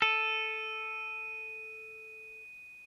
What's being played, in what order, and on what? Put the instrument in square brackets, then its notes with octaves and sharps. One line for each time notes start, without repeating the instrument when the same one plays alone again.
[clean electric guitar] A4 [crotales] D#7